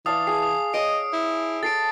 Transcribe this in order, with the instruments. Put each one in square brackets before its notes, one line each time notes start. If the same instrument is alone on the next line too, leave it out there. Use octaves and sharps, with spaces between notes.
[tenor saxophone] E3 [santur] D5 F5 A5 [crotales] D#6
[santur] G#4 [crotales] D#6 C7
[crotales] D#6
[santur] C#5 [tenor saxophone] D#5 [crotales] D7
[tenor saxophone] E4
[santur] A4 D#5 [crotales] A6 C7 D7